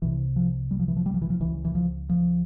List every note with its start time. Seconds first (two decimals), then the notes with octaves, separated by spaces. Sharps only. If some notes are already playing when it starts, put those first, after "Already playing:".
0.02 C2 C3 E3
0.36 F3
0.71 G3
0.79 F3
0.88 E3
0.97 F3
1.06 G3
1.14 F3
1.22 E3
1.30 F3
1.40 C#2 C#3 E3
1.65 E3
1.75 F3
2.09 F3